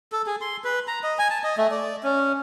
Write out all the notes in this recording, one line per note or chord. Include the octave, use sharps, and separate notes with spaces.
A4
G#4
C6
B4
A#5
D#5
G#5
A5
D#5
A3
D5
C#4